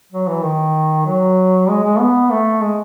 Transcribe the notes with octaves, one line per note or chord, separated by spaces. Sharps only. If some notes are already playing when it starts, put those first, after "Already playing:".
F#3
E3
D#3
F#3
G#3
G#3
B3
A3
G#3